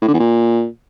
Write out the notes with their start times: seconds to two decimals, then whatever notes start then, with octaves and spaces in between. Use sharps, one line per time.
0.02 A2
0.08 D3
0.14 E2
0.20 A#2